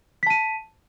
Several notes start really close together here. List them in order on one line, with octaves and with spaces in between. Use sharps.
B6 A5 D#7